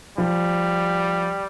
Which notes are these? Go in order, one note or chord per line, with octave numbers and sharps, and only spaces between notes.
F3 G3